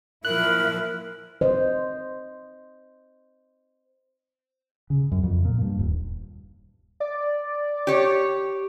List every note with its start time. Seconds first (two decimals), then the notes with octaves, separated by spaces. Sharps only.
0.25 A#2 F3 E4 A#4 F#6
1.41 C5 D#5
4.90 C#3
5.12 F#2
5.23 F2
5.45 A#2
5.61 G2
5.79 D#1
7.00 D5
7.87 G4 C#5